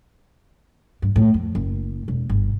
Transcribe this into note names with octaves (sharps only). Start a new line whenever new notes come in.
G2
A2
F2
F#1
E1
G1